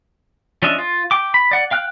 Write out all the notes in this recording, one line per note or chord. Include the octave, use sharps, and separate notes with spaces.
F3 C#4 D4 D#5 E5
F4
G5 D6
B5
D5 F#5
F5 G5 F6 F#6